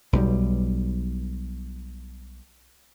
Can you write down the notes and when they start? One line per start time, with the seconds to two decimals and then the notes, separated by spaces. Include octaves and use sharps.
0.13 B1 B2 G3